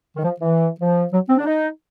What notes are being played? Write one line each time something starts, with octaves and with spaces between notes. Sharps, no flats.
D#3
F3
E3
F3
F#3
C4
D4
D#4